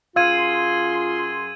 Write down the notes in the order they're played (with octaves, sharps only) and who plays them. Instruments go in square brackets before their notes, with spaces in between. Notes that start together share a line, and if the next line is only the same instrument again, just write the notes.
[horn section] F#2 G#4 C6 [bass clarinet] F4 [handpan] F5 [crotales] E6 G#6 D#7